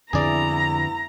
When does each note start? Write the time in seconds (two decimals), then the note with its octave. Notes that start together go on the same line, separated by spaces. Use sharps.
0.13 F2 D3 B3 C4 E4 G#4 D5 A#5